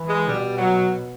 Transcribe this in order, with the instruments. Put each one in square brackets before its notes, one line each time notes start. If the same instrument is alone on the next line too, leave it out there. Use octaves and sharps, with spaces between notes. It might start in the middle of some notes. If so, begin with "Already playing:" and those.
Already playing: [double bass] E3
[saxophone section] G#3
[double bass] B2 [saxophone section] G3
[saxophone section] F#3